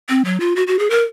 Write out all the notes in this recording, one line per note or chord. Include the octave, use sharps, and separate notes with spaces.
C4
F#3
F4
F#4
F#4
G#4
A#4